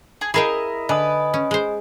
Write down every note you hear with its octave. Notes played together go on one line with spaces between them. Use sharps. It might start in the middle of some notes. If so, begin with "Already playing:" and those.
G#4
E4 G#4 A#4 D#5 F5 G5
D3 B4 D#5 G#5 D#6
C#4
G#3 C5